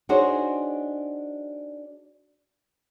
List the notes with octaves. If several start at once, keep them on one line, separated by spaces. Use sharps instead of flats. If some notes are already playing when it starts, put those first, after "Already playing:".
D4 D#4 F#4 G#4 C5 C#5